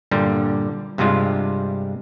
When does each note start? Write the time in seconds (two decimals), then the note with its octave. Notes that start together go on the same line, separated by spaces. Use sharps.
0.11 G2 A#2 D3 G3
0.98 G2 C3 G3 G#3 F4